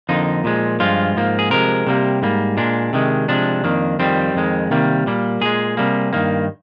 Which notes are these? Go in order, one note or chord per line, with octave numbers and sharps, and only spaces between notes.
F2 D3 F3 A#3 D#4
A#2 F3 G#3
G2 F3 G#3 F4
G#2 F3 A#3
G#4
C3 F3 G#3 A#4
C3 G3 A#3
G#2 G3 A#3
A#2 G#3 D4
C3 D#3 G#3
C3 F3 G#3 D4
F2 D#3 A#3
F2 D#3 G3 C4
F2 D#3 G#3
C3 D#3 G3 A#3
A#2 G3 A#3
A#2 G#3 G#4
C3 G3 A#3
G2 D#3 A#3